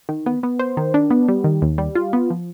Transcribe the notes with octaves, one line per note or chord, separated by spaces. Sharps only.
D#3
B3
B3
C5
D#3
D4
B3
G3
D#3
D#2
G3
F4
B3
F3